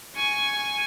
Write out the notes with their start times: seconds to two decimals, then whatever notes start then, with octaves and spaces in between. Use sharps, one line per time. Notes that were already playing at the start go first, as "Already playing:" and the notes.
0.16 G#5 C#6